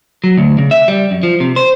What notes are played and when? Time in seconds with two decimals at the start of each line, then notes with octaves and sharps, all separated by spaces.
0.24 F#3
0.38 D2
0.59 C#3
0.71 E5
0.88 G3
1.11 F#2
1.23 F3
1.40 C3
1.56 C5